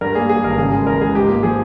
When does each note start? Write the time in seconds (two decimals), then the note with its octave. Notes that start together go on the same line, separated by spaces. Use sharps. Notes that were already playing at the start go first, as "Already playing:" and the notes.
0.01 G2 A#4
0.15 A#3 G#4
0.29 G3 G#4
0.44 G#1 A#4
0.58 C#3 G#4
0.72 G#3 G#4
0.87 E3 A#4
1.00 C#2 G#4
1.15 G#2 G4
1.29 A#3
1.43 F3 G#4